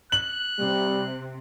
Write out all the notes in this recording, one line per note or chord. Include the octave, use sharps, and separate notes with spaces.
F#6 F#7
C3 G3 C4